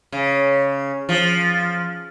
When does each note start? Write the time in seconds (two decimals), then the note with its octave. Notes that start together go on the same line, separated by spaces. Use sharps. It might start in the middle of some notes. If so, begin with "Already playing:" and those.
0.12 C#3
1.09 F3